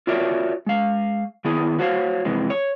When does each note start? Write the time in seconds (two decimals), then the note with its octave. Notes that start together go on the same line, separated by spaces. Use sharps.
0.07 F4 F#4 A#4 C#5 D5 E5
0.66 G#3 F5
1.45 D#3 B3 E4 G#4
1.79 F#4 C5 C#5 F5
2.25 F2 C3 E3 G#3
2.50 C#5